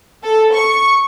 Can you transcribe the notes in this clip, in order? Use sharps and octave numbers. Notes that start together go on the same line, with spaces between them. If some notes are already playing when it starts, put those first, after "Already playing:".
A4
C#6